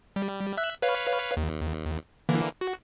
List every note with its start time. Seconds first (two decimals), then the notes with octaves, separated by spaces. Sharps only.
0.16 G3
0.57 E5 E6 F#6
0.82 B4 C#5 F5
1.37 D#2
2.29 D3 E3 A#3
2.61 F#4